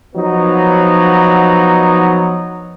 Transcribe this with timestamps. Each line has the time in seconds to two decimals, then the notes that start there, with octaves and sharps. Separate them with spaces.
0.16 F3 F#3 B3 D#4